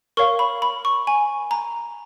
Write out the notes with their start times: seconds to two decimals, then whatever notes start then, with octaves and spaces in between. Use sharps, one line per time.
0.17 A#4 C#5 F5 C#6
0.39 B5
0.62 B5
0.85 C#6
1.07 G#5
1.51 A#5